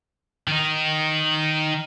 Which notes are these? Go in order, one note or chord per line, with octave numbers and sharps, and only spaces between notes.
D#3 D#4